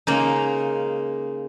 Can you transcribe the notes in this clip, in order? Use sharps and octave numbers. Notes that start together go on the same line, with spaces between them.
C#3 G#3 A#3 D#4